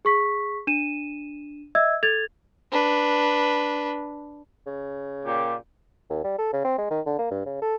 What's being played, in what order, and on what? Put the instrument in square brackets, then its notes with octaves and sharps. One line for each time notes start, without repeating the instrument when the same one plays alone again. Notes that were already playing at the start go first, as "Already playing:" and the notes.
[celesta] G#4 C#6 B6
D4 D#7 E7
D#5 E5 E6 G#6
A4 G#6 A6 F7
[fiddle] D4 B4
[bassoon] C#3
[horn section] A#2 G4
[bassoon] D#2
G3
A4
C#3
C4
G#3
D#3
D3
A#3
G2
C#3
A4